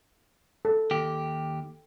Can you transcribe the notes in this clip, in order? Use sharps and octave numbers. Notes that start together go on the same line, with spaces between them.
A4
D#2 G4